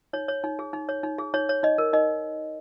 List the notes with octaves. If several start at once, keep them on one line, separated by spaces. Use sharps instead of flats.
D#4 C#5
C#5
D#4
G#4
D#4
C#5
D#4
G#4
D#4 C#5
C#5
D#4 D#5
A#4
D#4 D#5